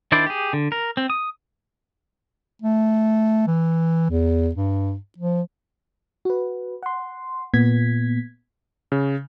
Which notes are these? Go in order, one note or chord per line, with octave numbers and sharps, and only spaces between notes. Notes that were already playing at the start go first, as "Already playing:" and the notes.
D#3 D4 E4 C5 D5
G4 G#4
D3
A#4
C4
D#6
A3
E3
E2
G2
F3
F#4 B4
F#5 C6
A#2 B3 G#6 B6
C#3